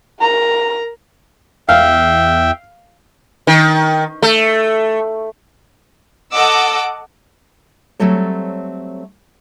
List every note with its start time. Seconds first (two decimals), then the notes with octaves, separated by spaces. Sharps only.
0.21 A#4 A#5
1.69 E2 E5 F5 G5
3.47 D#3
4.22 A3
6.32 A4 D#5 F#5 D6 E6
8.00 F#3 G3 A3 C4 A4 C#5